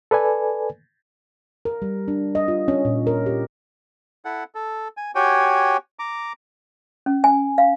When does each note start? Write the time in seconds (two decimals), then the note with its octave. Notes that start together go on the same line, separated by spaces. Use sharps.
0.11 A4 B4 D5 G#5
1.65 A#4
1.82 G3
2.08 D4
2.35 D#5
2.48 F4
2.68 C#4
2.85 A#2
3.07 A#4
3.26 G4
4.25 E4 A4 F#5
4.55 A4
4.97 G#5
5.15 F#4 G4 C#5 G5 G#5
5.99 A#5 D6
7.06 C#4
7.24 G#5
7.58 F5